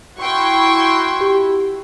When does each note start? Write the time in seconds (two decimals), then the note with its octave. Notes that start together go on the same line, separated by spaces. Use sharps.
0.18 E4 F#4 G5 C6 C#6
1.21 G4